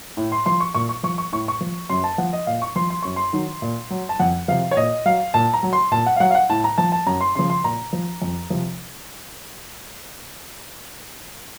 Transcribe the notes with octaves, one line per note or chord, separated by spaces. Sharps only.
A2
C6
F3 C6
C#6
A#2 C#6
C#6
F3 C#6
C#6
A2 C#6
C#6
F3
F#2 C6
A5
F3 F#5
D#5
A#2 F5
C#6
F3 C6
C6
F#2 C#6
C6
D#3 F#3
A#2
F#3
A5
F2 F#5
C3 F3 F5
C#5
A#2 D#5
F#3 F5
A#2 A5
A#5
F#3
C6
A#2 A5
F#5
F5
F#3 F#5
F5
F#5
A2 A5
A#5
F3 A5
A5
F#2 A#5
C6
C#3 F3 C6
C6
A#2 A#5
F3
F2
C3 F3